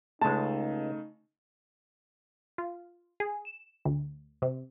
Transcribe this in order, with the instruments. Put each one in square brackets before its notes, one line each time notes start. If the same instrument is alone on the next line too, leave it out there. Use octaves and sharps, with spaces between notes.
[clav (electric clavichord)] C#2 G#3 [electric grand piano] C#3 A3 [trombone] D#4 [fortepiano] A5
[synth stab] F4
G#4
E7
D2
C3